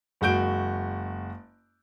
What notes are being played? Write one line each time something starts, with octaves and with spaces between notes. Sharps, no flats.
F#1 G#3 F#4 G6 D7